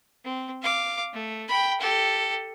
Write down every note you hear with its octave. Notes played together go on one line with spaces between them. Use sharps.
C4
F5 D6
A3
G5 B5
G4 A4